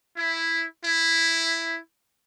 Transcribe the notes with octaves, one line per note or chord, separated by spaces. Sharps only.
E4
E4